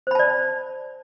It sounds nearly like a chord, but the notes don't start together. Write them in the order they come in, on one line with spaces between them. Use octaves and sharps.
C5 B5 A5 D5